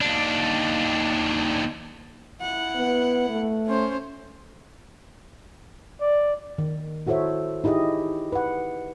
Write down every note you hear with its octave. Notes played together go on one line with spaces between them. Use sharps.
D#2 D4
E4 F#5
B3
A3
C#4 C5
D5
D#3
E4 F#4 A4 C5 C#5 E5
D#4 E4 G4 G#4 D#5
B4 F#5